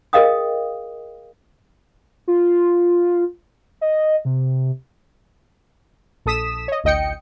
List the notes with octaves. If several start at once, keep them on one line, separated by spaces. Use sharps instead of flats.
G#4 A#4 D#5 F5 G5 D#6
F4
D#5
C3
A#1 A4 D#6 B6 E7
C#5 D#5
A1 D2 D#5 G5 C#7